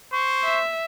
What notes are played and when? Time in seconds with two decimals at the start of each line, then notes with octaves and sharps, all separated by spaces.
0.12 C5 C#6
0.44 E5